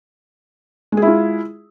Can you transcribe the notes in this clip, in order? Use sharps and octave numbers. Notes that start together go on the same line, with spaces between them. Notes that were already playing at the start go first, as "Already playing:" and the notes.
G#3 E4 F4 G#4